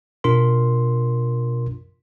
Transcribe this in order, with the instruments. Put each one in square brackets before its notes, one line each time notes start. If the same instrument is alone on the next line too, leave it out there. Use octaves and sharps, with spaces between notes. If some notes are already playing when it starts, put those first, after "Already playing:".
[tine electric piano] B2 D4 F4 A#4 C6